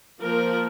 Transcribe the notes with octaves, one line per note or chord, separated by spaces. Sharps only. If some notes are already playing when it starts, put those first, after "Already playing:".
F3 A#3 A#4